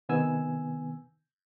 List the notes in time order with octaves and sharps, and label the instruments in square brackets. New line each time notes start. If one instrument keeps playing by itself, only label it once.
[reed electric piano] C3 D#3 B3 G#5 E6